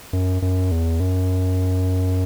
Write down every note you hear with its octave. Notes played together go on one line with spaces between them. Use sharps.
F#2
F#2
E2
F#2